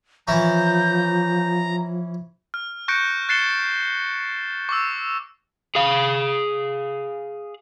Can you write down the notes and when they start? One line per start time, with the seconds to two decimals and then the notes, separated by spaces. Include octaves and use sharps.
0.28 E3 F3 C#4 A#5 G6
2.54 F6
2.88 C#6 F#6 G6 A#6 C#7 D7
3.29 F#6 A6 C7 C#7 E7 G7
4.69 C#6 D6 E6
5.75 G#4 F5